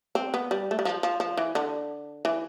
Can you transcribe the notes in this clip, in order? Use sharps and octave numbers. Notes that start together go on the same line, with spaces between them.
C4
B3
G3
A3
G3
F3
F3
F3
E3
D3
E3